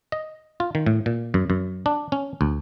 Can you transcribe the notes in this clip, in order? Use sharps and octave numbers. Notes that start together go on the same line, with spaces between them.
D#5
F4
D#3
A2
A#2
F#2
F#2
D4
C#4
D2